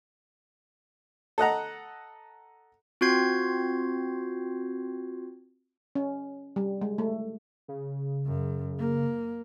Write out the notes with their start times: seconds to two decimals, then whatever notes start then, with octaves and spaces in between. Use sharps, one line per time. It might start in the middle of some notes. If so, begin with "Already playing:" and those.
1.38 A4 D#5 F#5 A#5
3.01 C4 F4 F#4 G6 G#6 C7
5.95 C#4
6.56 G3
6.81 G#3
6.98 A3
7.68 C#3
8.26 F#2
8.78 A#3